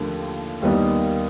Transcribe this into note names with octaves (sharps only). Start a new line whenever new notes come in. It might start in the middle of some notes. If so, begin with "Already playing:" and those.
Already playing: D#2 D3 F3 A3
D#2 D#3 G3 B3 D#4